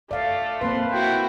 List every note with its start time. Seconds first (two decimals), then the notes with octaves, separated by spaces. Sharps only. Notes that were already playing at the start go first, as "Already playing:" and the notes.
0.11 A3 D5 F5
0.61 A#3 C4 B4 C6
0.92 E4 F#4 G5